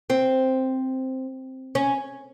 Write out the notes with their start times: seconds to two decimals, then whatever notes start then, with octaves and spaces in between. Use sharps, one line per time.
0.10 C4
1.75 C#4